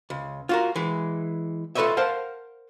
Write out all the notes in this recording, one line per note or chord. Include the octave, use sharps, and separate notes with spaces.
C#2
F4 F#4 A#4
E3 G#3
F4 A4 B4 C#5 D#5 E5
A#4 C5 F5 F#5 A5